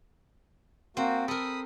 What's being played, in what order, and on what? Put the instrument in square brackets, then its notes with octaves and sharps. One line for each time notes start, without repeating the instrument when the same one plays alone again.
[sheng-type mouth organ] A#3 F#4 [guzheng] C4
[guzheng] A4 A#4 [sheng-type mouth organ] B5 D#6